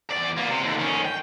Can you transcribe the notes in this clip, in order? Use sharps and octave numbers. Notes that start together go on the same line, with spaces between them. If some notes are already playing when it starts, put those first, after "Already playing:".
E2 D5
A#3 B3
C3
D#2 D3
D#3 C#4
G5